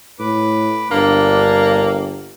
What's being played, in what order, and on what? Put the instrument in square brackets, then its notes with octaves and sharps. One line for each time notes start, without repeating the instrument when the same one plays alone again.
[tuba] A2 [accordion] B4 D6
[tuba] G1 [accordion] G2 D4 [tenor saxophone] A#3